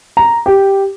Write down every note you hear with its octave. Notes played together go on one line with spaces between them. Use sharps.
A#5
G4